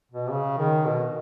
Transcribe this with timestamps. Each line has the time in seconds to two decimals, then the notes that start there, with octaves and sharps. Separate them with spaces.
0.11 B2
0.31 C#3
0.58 D#3
0.86 B2